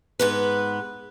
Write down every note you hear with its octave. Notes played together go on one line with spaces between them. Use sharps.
G#2 B3 B4